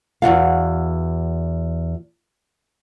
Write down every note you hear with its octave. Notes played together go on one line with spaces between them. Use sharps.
E2 C#3 F#4 F5